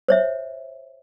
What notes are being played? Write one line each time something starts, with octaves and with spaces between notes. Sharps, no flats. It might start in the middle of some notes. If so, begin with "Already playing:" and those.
C5 C#5 E5